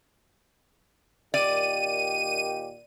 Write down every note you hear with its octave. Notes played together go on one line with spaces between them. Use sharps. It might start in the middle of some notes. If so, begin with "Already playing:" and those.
A#2 D#3 G4 D5 D#7